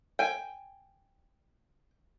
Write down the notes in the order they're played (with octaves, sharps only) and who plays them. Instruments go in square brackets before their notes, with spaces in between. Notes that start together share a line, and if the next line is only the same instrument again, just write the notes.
[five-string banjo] G5 G#5